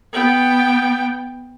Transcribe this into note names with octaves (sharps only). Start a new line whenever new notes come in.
B3 G5